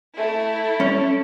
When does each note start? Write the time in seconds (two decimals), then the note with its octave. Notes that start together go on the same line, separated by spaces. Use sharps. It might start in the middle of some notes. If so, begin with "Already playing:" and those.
0.17 A3 E4
0.80 C#4